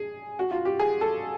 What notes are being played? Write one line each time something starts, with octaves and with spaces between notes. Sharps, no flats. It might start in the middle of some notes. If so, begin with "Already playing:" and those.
Already playing: G#4
F#4
F4
G4
G#4
A4